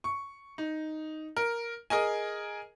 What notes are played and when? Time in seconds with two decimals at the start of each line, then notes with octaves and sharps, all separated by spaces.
0.04 C#6
0.58 D#4
1.37 A#4
1.90 G#4 A#4 D#5 G#5